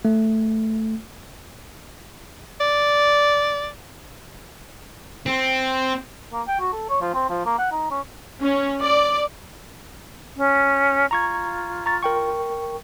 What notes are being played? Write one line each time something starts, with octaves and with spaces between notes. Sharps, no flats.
A3
D5
C4
A#3
G5
F#4
A4
C#5
F3
C4
F3
A#3
F#5
D#4
C#4
C#4
D5
C#4
F4 A#5 C#6 G#6
A#5 C#6 A6
A#4 G5 C#6